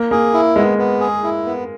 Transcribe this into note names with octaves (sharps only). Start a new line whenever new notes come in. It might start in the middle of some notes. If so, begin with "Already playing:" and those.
Already playing: A#3
A#3 G#4
E4
G#3 B3
B3
G#4
E4
B3